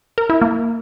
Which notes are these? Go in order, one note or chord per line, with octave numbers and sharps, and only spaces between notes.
A#4
E4
A#3